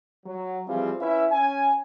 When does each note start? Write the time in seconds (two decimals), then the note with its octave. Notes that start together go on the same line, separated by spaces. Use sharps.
0.26 F#3
0.68 E3 F3 G3 C4 F4 G#4
1.00 C#4 E4 B4 E5
1.32 C#4 G#5